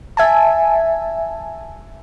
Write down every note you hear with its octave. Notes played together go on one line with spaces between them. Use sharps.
E5 G#5 A5